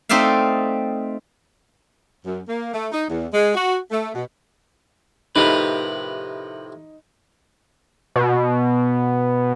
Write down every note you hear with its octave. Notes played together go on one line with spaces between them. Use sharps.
A3 C4 D#4 D5 E5 F5
F#2
A#3
A3
D#4
E2
G#3
F#4
A3
B2
A2 C3 F3 D#4 G4 A#4 B4
B2